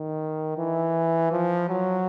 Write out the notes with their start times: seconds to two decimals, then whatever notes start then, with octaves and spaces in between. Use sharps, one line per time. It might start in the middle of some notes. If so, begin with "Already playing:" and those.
Already playing: D#3
0.58 E3
1.32 F3
1.69 F#3